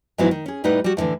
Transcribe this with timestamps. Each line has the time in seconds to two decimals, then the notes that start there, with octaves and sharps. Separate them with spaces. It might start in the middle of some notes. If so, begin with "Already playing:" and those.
0.18 G#2 E3 F#3 B3 D#4 E4
0.31 D#3
0.46 C#4 G#4
0.64 A2 G3 D#4 G4 B4 F#5
0.84 G3 F#4
0.97 E2 A2 D3 E3